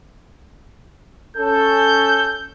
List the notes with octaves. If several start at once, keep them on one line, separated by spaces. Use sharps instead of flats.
C#4 A4 G6